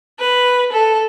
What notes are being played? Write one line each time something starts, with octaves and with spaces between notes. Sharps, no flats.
B4
A4